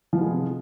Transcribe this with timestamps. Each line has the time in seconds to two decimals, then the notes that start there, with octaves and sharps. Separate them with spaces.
0.13 F3
0.17 B3
0.21 G#3
0.25 C4
0.29 C3